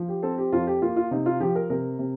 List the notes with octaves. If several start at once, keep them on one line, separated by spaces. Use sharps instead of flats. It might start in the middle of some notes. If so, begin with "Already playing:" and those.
Already playing: F3
G4
C4 A4
G4
F2 F4
G4
A#3 F4
F4
C3 D#4
F4
F3 G4
A#4
C3 A#4
C3